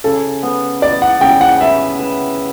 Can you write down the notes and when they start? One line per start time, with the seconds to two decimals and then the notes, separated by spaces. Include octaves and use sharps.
0.04 C#3 A4
0.43 B3
0.82 B3 D5
1.02 F#5
1.21 C#3 G5
1.41 F#5
1.60 B4 E5
1.99 B4